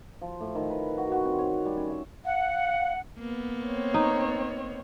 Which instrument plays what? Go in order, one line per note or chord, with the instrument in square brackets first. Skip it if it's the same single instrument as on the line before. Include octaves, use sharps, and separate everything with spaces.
[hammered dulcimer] F3
A2
D#3
B4
F#4
F#4
C4
C#5
G3
C#4
E5
[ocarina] F5 [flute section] F#5
[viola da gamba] A#3 B3
[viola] C4 C#5
[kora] D#4